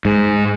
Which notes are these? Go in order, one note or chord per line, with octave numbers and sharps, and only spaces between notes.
G#2